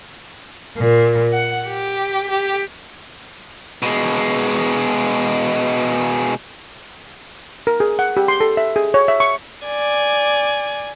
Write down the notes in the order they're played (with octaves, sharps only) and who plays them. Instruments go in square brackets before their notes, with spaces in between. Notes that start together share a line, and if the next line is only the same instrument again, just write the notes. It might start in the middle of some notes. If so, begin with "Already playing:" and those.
[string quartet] A#2
F#5
G4
G4
[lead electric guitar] B2 G#3
[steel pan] A#4
G#4
F#5
G4
C6
A4
E5
G#4
C#5
E5
C#6
[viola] D5 G#5